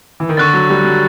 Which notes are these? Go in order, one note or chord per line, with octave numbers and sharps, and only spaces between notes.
E3
D#3
D3 C#6 F#6 A6
F#3
G3
F#3